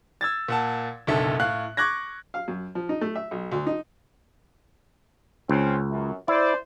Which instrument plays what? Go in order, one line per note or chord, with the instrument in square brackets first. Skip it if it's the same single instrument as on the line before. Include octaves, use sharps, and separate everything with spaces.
[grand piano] E6 G#6 A6
A#2 F#5 A5
F#1 B1 D3 A4 E5
A2 F5 F#6
C#6 D6 F#6 G#6 A#6
[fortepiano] F5
F#2
F3
D#4
A3
E5
B1
D2
D#4
[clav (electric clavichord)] C#2 [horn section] C4 C#4 F4
[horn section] F#2
[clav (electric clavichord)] E4 [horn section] C5 D5